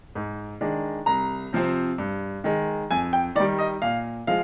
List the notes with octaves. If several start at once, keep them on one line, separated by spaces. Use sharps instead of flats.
G#2
D#3 G#3 D4
C2 A#5
C3 F3 C4
G2
D#3 G#3
F2 G#5
G5
D#3 G3 D5
D#5
A#2 F5
F3 G#3 F5